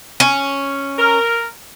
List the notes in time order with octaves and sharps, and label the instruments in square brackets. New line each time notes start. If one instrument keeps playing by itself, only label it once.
[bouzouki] C#4
[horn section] A#4